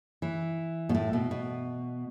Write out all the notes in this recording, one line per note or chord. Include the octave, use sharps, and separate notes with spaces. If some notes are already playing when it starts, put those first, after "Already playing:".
E3
B2
A2
B2
B2